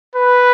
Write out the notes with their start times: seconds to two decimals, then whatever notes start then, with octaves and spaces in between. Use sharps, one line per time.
0.16 B4